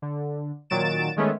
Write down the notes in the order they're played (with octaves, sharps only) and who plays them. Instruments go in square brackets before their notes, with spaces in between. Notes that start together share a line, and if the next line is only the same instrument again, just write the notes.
[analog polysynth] D3
A#2 D#3 F#3 A6 D7 E7
D#3 G#3 A3 B3 C#4